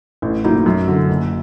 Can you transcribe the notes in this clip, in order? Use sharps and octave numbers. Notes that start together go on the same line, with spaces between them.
A1
A2 F#3 A#3 D#4
F#2
D3 F#3
F#1